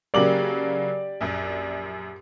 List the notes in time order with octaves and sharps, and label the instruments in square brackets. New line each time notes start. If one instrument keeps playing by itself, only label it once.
[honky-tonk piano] C#3 F#3 A#3 [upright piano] G4 D6 F#7 [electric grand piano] D5
[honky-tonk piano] A#1 F#2